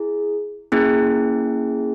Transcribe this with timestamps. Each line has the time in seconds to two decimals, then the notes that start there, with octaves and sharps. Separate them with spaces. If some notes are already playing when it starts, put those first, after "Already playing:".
Already playing: E4 G#4
0.72 A#3 C#4 E4 G#4